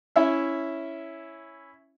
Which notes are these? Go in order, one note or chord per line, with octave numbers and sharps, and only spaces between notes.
C#4 E4 E5